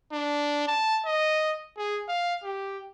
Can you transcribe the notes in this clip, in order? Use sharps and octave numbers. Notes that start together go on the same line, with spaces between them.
D4
A5
D#5
G#4
F5
G4